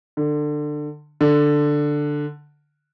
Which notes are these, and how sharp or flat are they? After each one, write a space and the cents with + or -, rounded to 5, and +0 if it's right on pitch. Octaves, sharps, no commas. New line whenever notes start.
D3 +20
D3 +5